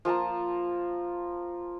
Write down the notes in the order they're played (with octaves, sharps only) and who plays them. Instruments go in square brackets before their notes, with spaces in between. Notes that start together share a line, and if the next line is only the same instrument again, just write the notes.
[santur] F3 A#3 A5 A#5